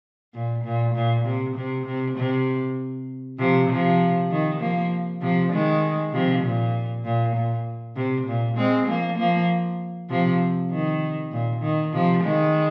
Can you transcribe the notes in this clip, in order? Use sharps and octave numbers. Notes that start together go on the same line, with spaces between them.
A#2
A#2
A#2
C3
C3
C3
C3
C3 F3
C3 F3
D#3
F3 A#3
C3 F3
D#3 G#3
C3 F3
A#2
A#2
A#2
C3
A#2
G#3 C4
F3 A#3
F3 A#3
C3 F3
D#3
A#2
D#3
C3 F3
D#3 G#3